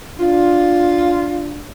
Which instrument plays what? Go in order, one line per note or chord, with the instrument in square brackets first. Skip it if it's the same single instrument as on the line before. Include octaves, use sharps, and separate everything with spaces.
[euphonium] D4 [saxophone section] F4